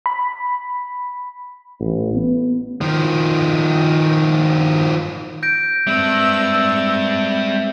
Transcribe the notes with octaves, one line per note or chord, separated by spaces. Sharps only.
B5
A1
B3
D#3 F3
G6 A#6 D7
G3 G#3 C4 B4 E5 E6